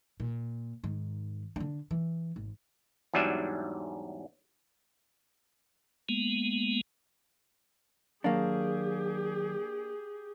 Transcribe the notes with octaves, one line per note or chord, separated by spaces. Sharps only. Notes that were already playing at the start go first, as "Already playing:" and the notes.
A#2
G#2 D#3
D3 D4
E3
G#1
E2 G#2 F#3 G3 D4 E5
G#3 A#3 B3
D#2 F#3 A#3 D4 G4 G#4 F5